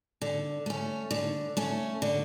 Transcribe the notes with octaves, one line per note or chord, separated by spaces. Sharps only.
D3
A3 C#4
D3
A3 C#4
D3